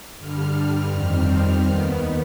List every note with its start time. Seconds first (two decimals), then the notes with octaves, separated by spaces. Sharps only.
0.18 G2 D3 G3 F6
0.91 F2 D#3 G3 C4
1.64 D#2 D#3 B3